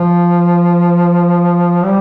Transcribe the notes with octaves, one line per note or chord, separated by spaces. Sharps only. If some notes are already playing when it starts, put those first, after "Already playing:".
Already playing: F3
G3